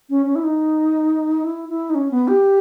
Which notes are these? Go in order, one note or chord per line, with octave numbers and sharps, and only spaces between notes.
C#4
C#4
E4
D#4
E4
E4
D#4
C#4
B3
G4